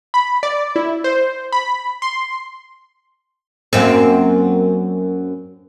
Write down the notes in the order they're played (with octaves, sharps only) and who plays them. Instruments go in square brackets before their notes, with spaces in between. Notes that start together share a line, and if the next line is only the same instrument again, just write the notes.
[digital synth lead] B5
D5
E4
C5
B5
C6
[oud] F#2 A#3 C4